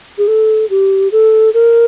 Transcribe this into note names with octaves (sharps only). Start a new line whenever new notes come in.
G#4
A4
G4
A4
A#4